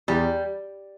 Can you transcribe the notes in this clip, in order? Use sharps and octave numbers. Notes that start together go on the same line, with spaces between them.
E2 G3